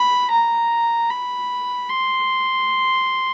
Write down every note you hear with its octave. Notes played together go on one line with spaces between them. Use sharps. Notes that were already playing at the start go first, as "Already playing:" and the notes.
Already playing: B5
A#5
B5
C6